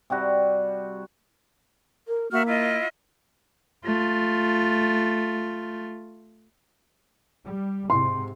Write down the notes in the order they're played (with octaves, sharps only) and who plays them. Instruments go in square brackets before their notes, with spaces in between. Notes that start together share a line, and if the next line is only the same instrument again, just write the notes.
[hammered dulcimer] C3 G3 F#4
[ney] A#4
[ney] A#3 [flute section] F#4 E5 F6
[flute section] E4 F4 D#5
[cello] A3 F4
[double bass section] G3
[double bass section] G#2 C3 [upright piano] C6